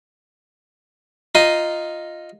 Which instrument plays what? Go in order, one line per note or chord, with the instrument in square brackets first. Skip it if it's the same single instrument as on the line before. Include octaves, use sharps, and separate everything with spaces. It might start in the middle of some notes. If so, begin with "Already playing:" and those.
[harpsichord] D#4 F4 D#5